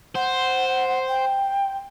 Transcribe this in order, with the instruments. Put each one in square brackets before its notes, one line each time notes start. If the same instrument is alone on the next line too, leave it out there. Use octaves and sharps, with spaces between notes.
[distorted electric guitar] C5 [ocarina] F#5
[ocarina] G5